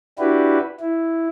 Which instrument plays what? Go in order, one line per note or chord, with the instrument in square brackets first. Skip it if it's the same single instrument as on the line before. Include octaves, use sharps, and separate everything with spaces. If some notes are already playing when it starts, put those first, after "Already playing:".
[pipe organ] D4 E4 F#4 G4 B4
E4